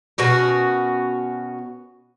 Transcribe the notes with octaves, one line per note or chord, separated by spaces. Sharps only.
B2 C#4 F#4 A#4